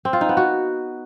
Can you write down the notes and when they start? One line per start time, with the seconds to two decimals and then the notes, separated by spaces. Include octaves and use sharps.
0.05 C4
0.13 F4
0.21 D#4
0.29 B3
0.37 F#4